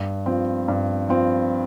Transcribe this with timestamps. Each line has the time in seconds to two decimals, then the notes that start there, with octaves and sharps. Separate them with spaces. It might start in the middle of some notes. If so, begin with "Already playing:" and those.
Already playing: G2
0.26 F3 C4
0.68 G2
1.09 F3 C4